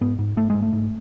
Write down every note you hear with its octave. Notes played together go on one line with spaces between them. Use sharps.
G#2 B3
G#2
G#2 A3
G#2 G#3
A3
G#2